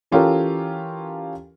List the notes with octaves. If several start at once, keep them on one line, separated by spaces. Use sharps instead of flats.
E3 C#4 F4 G4 A4 A#4